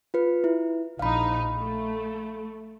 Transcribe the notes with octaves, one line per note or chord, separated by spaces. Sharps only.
F4 B4
E4
A#1 D#4 F5 B5
A3